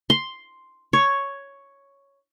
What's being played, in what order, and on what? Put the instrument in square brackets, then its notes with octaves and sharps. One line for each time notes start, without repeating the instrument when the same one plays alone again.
[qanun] C6
C#5